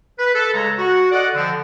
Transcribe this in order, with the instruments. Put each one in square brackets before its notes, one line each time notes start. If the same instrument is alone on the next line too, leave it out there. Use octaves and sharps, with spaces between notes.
[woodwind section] B4
A4
C#3 G#3 C#5 A#5
F#4 F#5
A4 D5 D#5 F#5
D3 F3 C4